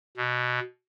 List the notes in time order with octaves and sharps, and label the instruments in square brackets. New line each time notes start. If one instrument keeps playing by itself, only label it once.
[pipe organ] B2